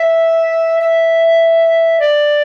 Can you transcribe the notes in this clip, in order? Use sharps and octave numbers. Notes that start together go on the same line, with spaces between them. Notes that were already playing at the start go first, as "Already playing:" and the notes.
Already playing: E5
E5
D5